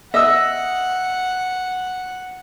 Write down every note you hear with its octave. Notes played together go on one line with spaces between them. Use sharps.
D#5 E5 F#5 D#6 E6